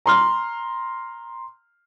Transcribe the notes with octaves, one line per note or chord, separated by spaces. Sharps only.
A#5 C6 F6